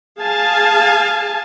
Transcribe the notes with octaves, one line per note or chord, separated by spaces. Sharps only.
G#4 F5 G#5 A5